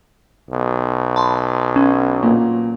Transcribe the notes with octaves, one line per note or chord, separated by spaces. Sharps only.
B1
A5 B5 C6
C#4
A#2